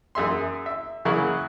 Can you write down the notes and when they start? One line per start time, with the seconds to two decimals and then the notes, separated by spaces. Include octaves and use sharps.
0.15 F#2 G#4 E5 C6
0.66 E5
1.05 C#3 F#3 A#3 E4 F#4 G#4